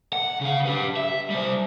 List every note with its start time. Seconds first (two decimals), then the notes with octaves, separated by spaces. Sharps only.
0.13 F#5
0.41 C#3 F5
0.65 G4 B4
0.96 E5
1.30 G3 C5